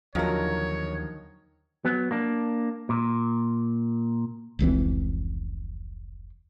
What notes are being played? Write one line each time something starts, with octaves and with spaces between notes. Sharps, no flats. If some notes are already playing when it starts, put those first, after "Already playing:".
D#2 D3 D#3 F3 F#3 A#4 C#5
F#3 B3
A#3 D4
A#2
F1 C#2 E3 C4